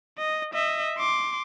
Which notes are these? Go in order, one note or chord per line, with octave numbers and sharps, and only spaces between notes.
D#5
D#5 E5
C6 D6